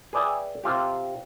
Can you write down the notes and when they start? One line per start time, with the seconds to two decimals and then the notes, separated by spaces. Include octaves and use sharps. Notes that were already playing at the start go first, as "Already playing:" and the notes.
0.13 G#4 B4 D5 E5 G5 G#5
0.64 C3 C4 F4 G4